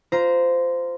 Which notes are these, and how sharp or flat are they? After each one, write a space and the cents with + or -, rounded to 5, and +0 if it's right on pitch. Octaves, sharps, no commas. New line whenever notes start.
F4 +0 C5 -15 A#5 +10